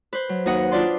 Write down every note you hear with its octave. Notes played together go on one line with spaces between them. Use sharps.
B4 C5
F#3
D#2 D#4 F#4 D#5 F#5
D4 F4 B4 D5 C6